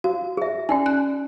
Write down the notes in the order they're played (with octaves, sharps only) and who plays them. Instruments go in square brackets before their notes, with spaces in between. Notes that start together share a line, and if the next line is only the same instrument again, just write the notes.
[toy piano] F#4 [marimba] F5
[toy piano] G#4 E5
[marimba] C#4 D5 G#5 [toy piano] D#4
[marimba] F#6